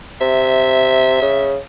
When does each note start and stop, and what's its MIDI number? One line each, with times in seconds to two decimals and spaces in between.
0.21 1.18 48
0.21 1.52 76
1.22 1.57 49